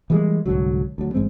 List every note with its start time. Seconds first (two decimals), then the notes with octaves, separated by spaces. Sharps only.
0.10 E3 G3 G#3 A#3
0.46 C2 G#2 D3 F#3
0.98 D2 F#3
1.14 A1 G#2 G#3 C4